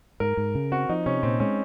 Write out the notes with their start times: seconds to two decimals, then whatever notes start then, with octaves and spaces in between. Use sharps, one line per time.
0.20 G#2 A#4
0.37 G#2
0.55 C#3
0.72 C4 F#4
0.89 F3 D#4
1.06 C3 C#4
1.23 A#2 C4
1.40 G#3 C#4